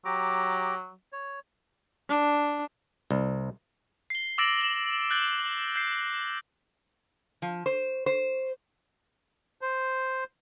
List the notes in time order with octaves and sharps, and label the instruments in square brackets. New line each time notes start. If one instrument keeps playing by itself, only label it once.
[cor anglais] F#3 [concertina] G4 A#5 D6
[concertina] C#5
[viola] D4
[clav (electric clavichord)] C2
[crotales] C7 G7
D6 E6 A6 A#6 D7 F#7
E7 G7
F#6 G6 A6 F#7 G7
G6 C7
[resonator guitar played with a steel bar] F3
C5
C5
[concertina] C5